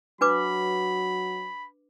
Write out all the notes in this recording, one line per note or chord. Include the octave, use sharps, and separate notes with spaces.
F#3 D4 B4 B5 D6